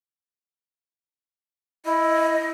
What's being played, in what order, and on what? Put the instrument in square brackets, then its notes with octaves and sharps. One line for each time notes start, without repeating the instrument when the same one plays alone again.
[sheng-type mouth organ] E4 [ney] D#5